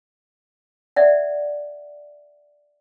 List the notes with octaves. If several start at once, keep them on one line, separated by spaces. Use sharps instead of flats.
D5 E5 F#5